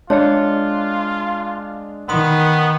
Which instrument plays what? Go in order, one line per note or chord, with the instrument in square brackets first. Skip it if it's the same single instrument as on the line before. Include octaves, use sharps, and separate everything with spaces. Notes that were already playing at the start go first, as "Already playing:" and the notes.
[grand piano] G#3 D4 [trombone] F4 [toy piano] G#4 C#5
[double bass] D#3 [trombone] B3 [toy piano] C6 D#6